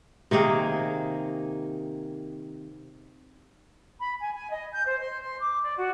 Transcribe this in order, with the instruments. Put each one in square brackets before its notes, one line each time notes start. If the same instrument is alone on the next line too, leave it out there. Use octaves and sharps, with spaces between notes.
[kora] C3 D#3 A#3 G#4
[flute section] B5
G#5
G#5
D#5
G6
C5
C6
C6
D6
D5
F#4